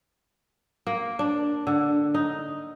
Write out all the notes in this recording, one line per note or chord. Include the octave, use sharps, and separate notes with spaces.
A#3
D4
D3
D#4